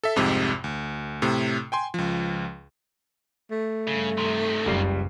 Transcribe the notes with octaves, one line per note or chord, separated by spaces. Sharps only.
A4 E5
C2 F2 G#2 C3
D2
A2 C3
G5 G#5 C6
C#2 F3
A3
G2 C#3
C3 D#3 C6
F#1 C#2 G3 C7